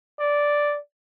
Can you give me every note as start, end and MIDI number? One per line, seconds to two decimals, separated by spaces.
0.19 0.77 74